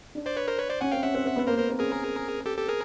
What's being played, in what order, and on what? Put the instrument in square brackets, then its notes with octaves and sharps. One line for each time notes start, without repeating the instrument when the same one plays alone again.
[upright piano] D4
[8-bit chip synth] C5 D5
B4 C#5
A#4 C5
B4 C#5
C5 D5
[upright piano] C#4 [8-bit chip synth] F#5 G#5
[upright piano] C4 [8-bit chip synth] F5 G5
[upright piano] C#4 [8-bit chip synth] E5 F#5
[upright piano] C4
C4
B3
[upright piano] A#3 [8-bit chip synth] A#4 C5
[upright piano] B3 [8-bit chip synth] A#4 C5
[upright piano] C4
[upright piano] C#4 [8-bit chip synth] G#4 A#4
[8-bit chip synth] G4 A4
G4 A4
G#4 A#4